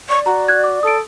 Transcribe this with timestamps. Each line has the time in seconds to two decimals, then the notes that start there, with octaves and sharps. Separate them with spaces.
0.09 D5 C#6
0.26 F#4 A#5
0.48 F#6 G#6
0.64 D6
0.83 A4 D#6 D7